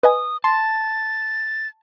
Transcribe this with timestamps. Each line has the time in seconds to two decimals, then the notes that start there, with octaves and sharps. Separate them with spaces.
0.03 B4 D#5 G#5 D#6
0.44 A5 C6 A6